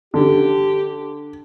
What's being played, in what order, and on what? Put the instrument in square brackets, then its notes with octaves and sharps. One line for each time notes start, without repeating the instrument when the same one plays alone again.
[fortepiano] D3 [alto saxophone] G4